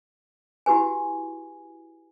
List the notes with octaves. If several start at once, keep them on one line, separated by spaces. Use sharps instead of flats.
E4 F#4 G4 B4 G#5